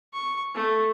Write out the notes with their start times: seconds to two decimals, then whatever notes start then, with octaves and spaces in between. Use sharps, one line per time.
0.14 C#6
0.55 A3